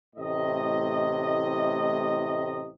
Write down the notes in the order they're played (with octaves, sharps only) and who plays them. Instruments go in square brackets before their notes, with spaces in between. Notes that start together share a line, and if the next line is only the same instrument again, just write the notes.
[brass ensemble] A1 A2 C3 D#5